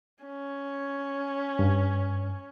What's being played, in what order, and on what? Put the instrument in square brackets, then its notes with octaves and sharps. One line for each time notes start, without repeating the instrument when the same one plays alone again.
[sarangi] C#4
[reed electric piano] G2